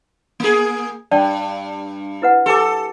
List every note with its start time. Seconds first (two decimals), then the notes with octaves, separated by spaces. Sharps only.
0.40 A#3 G#4
1.11 G2 D5 G5 A5
2.22 E4 B4 F#5
2.46 G4 A4 G#5 D6